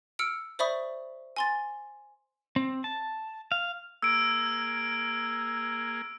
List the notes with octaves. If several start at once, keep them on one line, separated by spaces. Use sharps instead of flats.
E6 F6 C#7 D7
C5 D5 E5 B5 C#6 D#6
G#5 C6 A6
C4
A5
F5
A#3 G#4 E6 D7